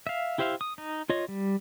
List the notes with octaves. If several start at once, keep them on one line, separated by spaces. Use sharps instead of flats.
E5 F5
E4 G4 C5 E5 F5
D#6
D#4
F4 C#5 D#5
G3